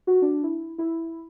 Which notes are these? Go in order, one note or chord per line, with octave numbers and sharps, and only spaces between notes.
F#4
D4
E4
E4